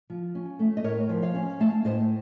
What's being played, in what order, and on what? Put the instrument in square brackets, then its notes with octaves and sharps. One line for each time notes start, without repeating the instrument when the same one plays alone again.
[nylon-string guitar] F3
C#4
A3
D#5
A2 A#4 C#5
F3
C#5 F5
C#4
A3 F5 A5
A2 C5 D#5